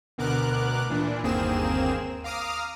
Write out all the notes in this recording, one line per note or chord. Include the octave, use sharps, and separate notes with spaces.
D2 B2 A#4 D6 F#6
A#2 E3 D4
G1 D#2 A#3 C4 G#4 E7
F5 A#5 D6 D#6 F6